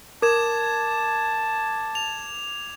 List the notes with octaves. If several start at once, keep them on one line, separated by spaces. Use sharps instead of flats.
A#4 A5 D6 G#6 E7
F7